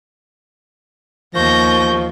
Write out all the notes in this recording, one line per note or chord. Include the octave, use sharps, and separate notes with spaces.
D#2 F3 B3 C#6 G6 A#6